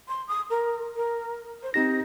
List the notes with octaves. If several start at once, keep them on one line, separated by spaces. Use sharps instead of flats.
C6
D#6
A#4
A#4
C5
C4 D#4 G4 A#6